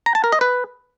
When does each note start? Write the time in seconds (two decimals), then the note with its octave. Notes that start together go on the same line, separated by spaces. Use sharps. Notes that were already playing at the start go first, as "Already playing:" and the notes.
0.06 A#5
0.15 A5
0.24 A#4
0.32 D#5
0.41 B4